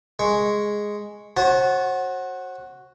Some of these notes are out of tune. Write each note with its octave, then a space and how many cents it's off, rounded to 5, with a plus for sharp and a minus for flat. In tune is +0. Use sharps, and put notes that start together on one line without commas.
G#3 +0 C#6 -10
F#4 +0 C5 +45 A5 -25